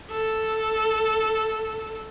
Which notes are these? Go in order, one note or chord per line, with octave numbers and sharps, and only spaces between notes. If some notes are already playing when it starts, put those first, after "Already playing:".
A4